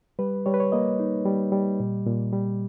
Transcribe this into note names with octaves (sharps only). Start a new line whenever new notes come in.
G3 B4
G3 C#5
B4
C#5
A#3 D#5
D#4
G3
G3
A#2
A#2
G3